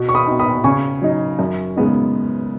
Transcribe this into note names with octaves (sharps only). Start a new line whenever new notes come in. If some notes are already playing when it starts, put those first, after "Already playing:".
Already playing: B2
C#6
B5 D#6
B3 D#4
B5 D#6
C#3 G#5 C#6
F#3 D#4
F#2
C#3 G#3 B3 D#4